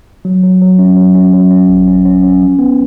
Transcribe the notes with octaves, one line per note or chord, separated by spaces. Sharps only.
F#3
F#3
F#3
C#4
F#3
C#4
F#3
C#4
A1
C#4
C#4
C#4
F3
B3